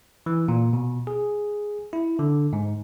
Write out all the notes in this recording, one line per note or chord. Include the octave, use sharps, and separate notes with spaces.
E3
A#2
B2
G#4
E4
D3
G#2